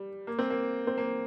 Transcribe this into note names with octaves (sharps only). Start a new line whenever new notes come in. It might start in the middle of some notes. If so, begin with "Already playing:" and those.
Already playing: G3
A#3
C4
A#3
C4
A#3